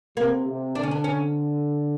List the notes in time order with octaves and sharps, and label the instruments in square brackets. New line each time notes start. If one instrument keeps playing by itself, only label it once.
[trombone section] C3 [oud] A#3
[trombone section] C3
[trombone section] D3 [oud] D4
[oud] C#4
D4
C#4